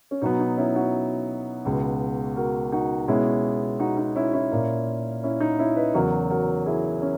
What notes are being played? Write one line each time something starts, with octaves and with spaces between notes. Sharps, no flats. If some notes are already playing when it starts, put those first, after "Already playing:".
C#4
B2 F#3 B3 D#4
D#4
C#4 E4
D#4 F#4
C#2 B2 G#3 B3
F#4 A#4
D#4 F#4
B2 G#3 B3 C#4 E4
D#4 F#4
D#4 F#4
C#4 E4
C#4 E4
A#2 A#3
C#4 E4
D#4
C#4 E4
B4 D#5
E2 C#3 F#3 F#4 A#4
F#4 A#4
E4 G#4
C#4